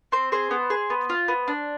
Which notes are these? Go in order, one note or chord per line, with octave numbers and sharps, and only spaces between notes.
C4 C5
G#4 C5
B3
G#4
B3
F4
B3
D4